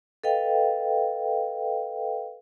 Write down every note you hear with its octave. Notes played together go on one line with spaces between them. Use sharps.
A4 B4 D#5 F5 G5